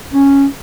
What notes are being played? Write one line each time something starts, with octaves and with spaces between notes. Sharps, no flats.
C#4